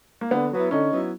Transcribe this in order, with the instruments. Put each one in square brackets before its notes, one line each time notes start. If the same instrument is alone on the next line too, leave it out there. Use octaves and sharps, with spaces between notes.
[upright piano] A#3
[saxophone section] D3 [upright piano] B3
[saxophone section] F#3 B3 E4
[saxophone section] D3 [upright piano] C#4 D#4
[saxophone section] F#3 B3 E4